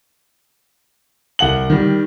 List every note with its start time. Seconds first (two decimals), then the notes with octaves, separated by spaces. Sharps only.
1.39 C2 F#5 F#7
1.70 D#3 G3